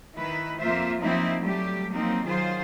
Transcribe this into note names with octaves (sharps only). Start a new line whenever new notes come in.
D#3 E4 B4
F2 A#3 F4 C5 E5
F3 F#3 A#3 C4 D#4 E4
F#3 G3 A3 G4
F3 F#3 A#3 C4 D#4
D#3 F#3 F4 G#4 C5